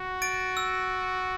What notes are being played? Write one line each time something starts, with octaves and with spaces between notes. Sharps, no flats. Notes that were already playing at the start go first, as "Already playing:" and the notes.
Already playing: F#4
A6 D7
E6